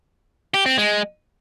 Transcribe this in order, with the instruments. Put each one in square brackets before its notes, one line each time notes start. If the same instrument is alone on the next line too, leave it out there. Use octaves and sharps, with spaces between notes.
[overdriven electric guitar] G4
C4
G#3